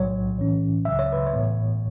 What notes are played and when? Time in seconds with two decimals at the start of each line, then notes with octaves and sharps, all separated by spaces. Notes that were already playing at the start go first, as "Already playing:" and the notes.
Already playing: B1 A2 F#3 C#5
0.36 A1 A2 E3 C#4
0.85 C#2 C#3 F#3 E5
0.99 C#5
1.13 B4
1.26 C#5
1.33 A1 A2 E3 B3